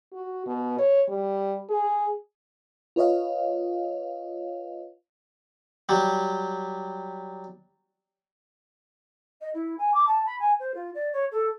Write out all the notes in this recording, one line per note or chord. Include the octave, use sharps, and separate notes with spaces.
F#4
B2
C#5
G3
G#4
F4 B4 C#5 D#5 F5
F#3 G3
D#5
E4
G#5
D6
A5
B5
G#5
C5
F4
D5
C#5
A4